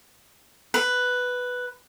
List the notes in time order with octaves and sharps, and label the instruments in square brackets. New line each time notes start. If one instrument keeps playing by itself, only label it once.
[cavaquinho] B4